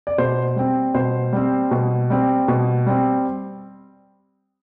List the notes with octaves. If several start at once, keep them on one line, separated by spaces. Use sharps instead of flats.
D5
B2 C5
G3 C4
B2 C5
G3 C4
B2
G3 C4
B2
G3 C4